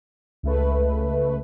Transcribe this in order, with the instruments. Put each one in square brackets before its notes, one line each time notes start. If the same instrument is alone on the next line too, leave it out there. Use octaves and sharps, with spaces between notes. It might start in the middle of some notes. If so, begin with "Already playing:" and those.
[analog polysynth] C#2 A3 B4